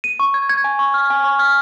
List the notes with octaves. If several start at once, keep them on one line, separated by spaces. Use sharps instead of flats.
D#7
C#6
G#6
G#6
G#5
C#6
F6
G#5
C#6
F6